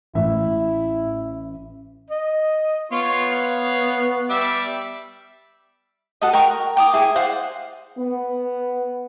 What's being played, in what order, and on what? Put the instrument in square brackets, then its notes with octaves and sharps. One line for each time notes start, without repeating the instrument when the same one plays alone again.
[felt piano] A1 [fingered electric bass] A2 [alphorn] E4 [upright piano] E5
[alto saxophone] D#5
[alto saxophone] B3 [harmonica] F4 C#5 F5
[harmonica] C#5 F5
G3 E5 D6
[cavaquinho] F#4 A4 D#5
A#4 G5 A#5 C#6
G5 D6 D#6
E4 G#4
C5 D5 F5 F#5
[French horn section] B3